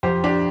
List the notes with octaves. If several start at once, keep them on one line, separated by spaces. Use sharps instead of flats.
F2 F3 G4 C5
D4 G4